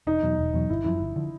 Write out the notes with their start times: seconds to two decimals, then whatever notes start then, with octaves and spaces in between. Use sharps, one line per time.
0.07 E1 D#4
0.22 E2 B2 F#3
0.38 E1
0.53 E2 B2 F#3
0.69 G1 E4
0.84 F#2 D3 F3 E4
1.00 G1
1.16 D3 F3